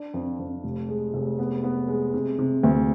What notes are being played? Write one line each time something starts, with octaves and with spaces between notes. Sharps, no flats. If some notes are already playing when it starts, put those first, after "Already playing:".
Already playing: D4
F2
F2
F1
G#3
F1
B3
B3
G#3
C3
C3
D2